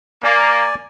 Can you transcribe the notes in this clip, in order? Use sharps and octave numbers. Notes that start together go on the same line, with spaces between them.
A#3 D5 G#5